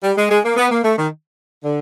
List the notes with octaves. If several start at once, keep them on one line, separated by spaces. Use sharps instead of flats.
G3
G#3
G#3
A#3
B3
A#3
A3
D#3
D3